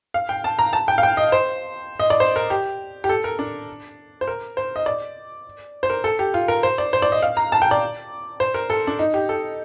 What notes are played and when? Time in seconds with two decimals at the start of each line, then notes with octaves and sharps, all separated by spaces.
0.14 F5
0.29 G5
0.44 A5
0.59 A#5
0.73 A5
0.88 G5
0.98 F5
1.03 G5
1.17 D#5
1.32 C5
1.99 D#5
2.10 D5
2.20 C5
2.36 A#4
2.50 G4
3.04 G4
3.09 A4
3.24 A#4
3.39 D4
4.21 C5
4.27 A#4
4.57 C5
4.76 D#5
4.86 D5
5.83 C5
5.90 A#4
6.04 A4
6.19 G4
6.34 F4
6.48 A#4
6.63 C5
6.78 D5
6.93 C5
7.02 D5
7.12 D#5
7.22 F5
7.37 A#5
7.52 A5
7.62 G5
7.71 D5
8.40 C5
8.54 A#4
8.70 A4
8.87 D4
8.99 D#4
9.14 G4
9.29 A4